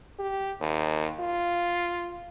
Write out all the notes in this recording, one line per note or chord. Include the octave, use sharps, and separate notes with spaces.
G4
D#2
F4